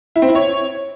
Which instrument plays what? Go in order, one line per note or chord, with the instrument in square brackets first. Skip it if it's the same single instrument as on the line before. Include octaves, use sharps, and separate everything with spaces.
[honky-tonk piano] E4
C4
E4
C#5